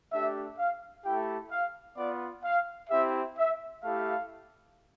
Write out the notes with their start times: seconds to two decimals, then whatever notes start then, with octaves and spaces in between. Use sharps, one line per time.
0.12 A3 D4 G4 E5
0.59 F5
1.05 A3 E4 G4 G5
1.51 F5
1.97 B3 F4 D5
2.44 F5
2.90 C4 E4 G4 E5
3.37 E5
3.83 A3 E4 G4 F5